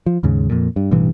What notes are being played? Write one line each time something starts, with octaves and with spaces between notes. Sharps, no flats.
F3
D#2 G#2 C#3
F2 A#2
G2
A1 G2 B2 E3